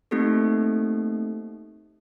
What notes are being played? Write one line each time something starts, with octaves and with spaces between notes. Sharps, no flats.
A3 A#3 C4 D#4 G4 A4